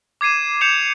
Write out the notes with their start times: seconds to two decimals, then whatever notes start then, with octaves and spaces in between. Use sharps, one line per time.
0.21 D6 G#6 C7 D#7 E7
0.61 D6 G6 C#7 E7 F7